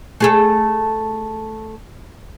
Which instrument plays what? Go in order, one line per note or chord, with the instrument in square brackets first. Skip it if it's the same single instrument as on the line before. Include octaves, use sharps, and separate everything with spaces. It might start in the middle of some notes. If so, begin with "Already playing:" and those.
[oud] A3 G#4 A4